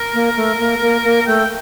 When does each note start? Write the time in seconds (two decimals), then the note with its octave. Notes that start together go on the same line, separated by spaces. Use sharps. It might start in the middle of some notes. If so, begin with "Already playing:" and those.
Already playing: A#4
0.14 A#3
0.36 A3
0.59 A#3
0.81 A#3
1.04 A#3
1.26 A3 G5